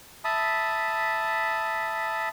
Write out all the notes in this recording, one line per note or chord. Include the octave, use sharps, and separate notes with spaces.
E5 A5 B5 D#6